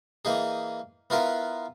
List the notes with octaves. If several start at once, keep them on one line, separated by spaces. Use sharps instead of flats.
E3 A#3 D#4 G#4
B3 E4 F4 A#4 B4